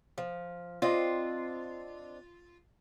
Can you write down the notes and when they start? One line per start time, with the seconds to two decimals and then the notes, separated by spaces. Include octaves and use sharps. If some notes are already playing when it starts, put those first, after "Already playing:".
0.18 F3
0.82 C4 D4 F4 D#5